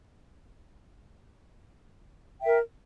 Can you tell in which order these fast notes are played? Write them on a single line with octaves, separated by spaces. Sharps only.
G5 E5 A#4